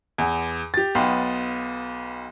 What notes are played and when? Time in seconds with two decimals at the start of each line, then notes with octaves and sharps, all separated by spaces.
0.18 E2
0.74 G4 A6
0.95 B1 B3 F5 G5 B5 C6